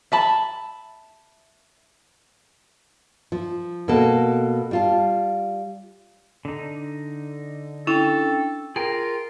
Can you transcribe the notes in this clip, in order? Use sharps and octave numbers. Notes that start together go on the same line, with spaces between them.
E5 A5 B5
F3
B2 A#3 A4
G3 F4 A5
D3 D#4
C#4 D4 E4 A4 G5
F4 G#4 A#4 G5 A#5